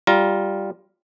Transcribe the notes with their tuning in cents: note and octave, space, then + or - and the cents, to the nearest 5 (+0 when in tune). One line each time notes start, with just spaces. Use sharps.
G3 +0 F4 +0 A#5 +15